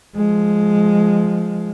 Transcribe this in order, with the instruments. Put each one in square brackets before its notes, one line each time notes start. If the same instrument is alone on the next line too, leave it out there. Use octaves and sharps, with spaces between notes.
[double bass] F3 G#3